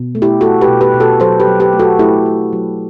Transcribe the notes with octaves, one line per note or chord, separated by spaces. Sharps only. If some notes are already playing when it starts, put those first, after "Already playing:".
Already playing: B2
A3
E4 G4
A3 F#4 A4
G4 B4
B2
G4 B4
B2
F#4 A4
F#3 A4 C5
G4 B4
F#3
G4 B4
A3
F#4 A4
A3 E4 G4
A3
F#3